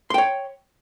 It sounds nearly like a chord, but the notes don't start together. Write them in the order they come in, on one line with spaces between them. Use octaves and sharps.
C6 G5 C#5